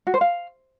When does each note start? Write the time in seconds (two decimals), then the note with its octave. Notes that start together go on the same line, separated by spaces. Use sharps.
0.07 F#4
0.14 C5
0.21 F5